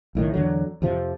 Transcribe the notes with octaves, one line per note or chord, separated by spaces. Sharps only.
B1 A2 D#3
E2 D3 F#3
F2 C3 F3